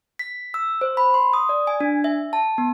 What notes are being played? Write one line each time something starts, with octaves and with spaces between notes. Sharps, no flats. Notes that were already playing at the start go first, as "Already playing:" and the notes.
B6
E6
C5
B5
C6
D#6
D5
G#5
D4
E5
A5
B3